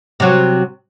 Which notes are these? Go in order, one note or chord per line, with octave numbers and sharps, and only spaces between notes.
C3 F#3